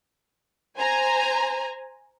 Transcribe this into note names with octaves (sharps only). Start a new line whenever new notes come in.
C5 G#5 A#5